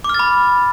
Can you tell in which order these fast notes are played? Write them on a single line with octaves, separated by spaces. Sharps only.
D6 F6 A6 B5